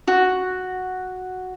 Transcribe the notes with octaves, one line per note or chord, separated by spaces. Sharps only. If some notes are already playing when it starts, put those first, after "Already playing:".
F#4